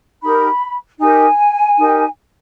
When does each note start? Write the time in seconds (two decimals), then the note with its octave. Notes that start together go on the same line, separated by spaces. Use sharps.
0.22 D#4 G4 A#4 B5
0.99 D#4 G4 A#4 G#5
1.77 D#4 G4 A#4